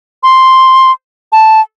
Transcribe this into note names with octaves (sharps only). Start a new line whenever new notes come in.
C6
A5